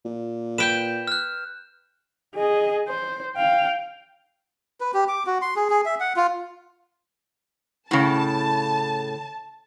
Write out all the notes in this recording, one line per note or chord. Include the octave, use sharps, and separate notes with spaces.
A#2
B4 G5 G6 E7
F6 F#6
G#4 D#5
C5
F5 G5
B4
G4
D6
F#4
C6
G#4
G#4
E5
F#5
F4
A2 C#3 A5